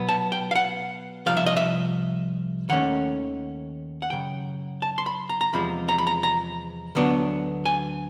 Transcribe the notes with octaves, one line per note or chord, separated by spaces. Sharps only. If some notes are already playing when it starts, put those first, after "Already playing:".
Already playing: B2 F#3 B3
A5
G5
F5
F#5
C2 C3 F3 F5
E5
D#5
E5
D#2 D#3 A3 C#4 F#5
F#5
F#2 C#3 G5
A5
C6
B5
A#5
A#5
E2 C3 F3 G#3 B5
A#5
B5
A#5
A#5
D2 D3 F#3 B3 D4
G#5